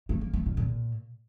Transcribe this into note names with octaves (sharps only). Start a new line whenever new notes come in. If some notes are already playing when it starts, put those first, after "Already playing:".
A3
A#3
A3
A#2
A#2